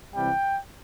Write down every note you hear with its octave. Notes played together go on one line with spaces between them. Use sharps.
C2 C3 E3 G3 G5